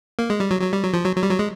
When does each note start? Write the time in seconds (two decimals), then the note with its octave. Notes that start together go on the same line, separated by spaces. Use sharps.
0.19 A#3
0.30 G#3
0.40 G3
0.51 F#3
0.61 F#3
0.73 G3
0.83 F#3
0.94 F3
1.05 F#3
1.16 F#3
1.23 G3
1.31 F#3
1.39 G#3